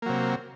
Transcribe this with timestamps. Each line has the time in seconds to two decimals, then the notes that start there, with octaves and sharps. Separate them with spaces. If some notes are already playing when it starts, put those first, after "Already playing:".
0.02 A#3
0.06 F#3
0.09 C3